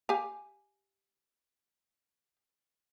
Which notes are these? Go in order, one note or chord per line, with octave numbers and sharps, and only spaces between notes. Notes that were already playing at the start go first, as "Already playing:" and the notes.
G4 F5 G#5